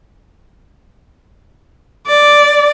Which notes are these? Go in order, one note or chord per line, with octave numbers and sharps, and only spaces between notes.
D5